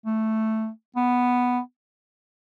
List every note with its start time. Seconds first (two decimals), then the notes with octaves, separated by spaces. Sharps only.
0.06 A3
0.96 B3